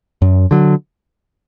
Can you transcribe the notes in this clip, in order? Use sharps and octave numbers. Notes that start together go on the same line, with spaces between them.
F#2
D3 F#3